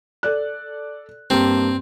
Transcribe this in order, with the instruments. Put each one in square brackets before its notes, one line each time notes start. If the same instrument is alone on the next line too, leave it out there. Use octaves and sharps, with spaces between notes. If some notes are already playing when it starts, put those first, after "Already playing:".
[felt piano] A4 D5 F#6
[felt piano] G2 A#3 [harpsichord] C4